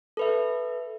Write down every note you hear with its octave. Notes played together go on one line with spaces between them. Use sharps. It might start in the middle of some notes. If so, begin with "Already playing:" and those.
A4 B4 E5